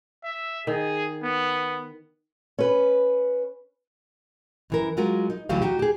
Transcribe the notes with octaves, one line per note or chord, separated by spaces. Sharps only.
E5
D#3 G#4
B3
C#4 B4
F#2 E3 A#4
F#3 G#3 F4 F#4 A#4
D#4
D2 D3 E3 F#3 G4 F5
D#4 F#4 G4
G4 G#4